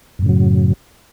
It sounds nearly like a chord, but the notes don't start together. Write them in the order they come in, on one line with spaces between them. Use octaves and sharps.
F#2 A2 C#3 F#3